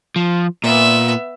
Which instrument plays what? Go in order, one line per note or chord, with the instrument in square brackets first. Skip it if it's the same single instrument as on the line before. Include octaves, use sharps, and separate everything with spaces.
[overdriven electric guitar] F3
[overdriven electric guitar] A#2 [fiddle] B3 E5